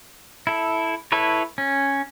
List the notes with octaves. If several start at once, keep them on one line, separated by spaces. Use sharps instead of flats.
E4 A4
E4 A4 B4 C#5
C#4